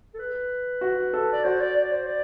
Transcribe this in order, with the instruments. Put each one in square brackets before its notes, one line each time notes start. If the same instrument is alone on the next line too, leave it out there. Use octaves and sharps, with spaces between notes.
[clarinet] A4
B4
[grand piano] F#4
A4
[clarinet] D5
[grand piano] F#4 [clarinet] C5
[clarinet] D5
D5
C5
D5